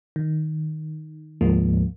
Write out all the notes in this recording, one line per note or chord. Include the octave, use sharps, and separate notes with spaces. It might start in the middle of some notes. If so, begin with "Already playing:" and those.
D#3
D2 G#2 F3 G#3 A#3